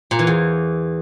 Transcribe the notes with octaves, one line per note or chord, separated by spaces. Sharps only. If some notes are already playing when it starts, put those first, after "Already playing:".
A#2
E3
E2